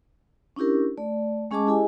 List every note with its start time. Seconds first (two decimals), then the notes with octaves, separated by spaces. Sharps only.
0.56 C#4 D4 E4 G4 A#4
0.98 A3 D5
1.51 G#3 C#4 G#4 D#5 A5 D6
1.67 E4 G4 G#4 D#5 G#5